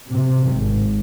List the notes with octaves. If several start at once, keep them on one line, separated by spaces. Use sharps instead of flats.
C3
G#1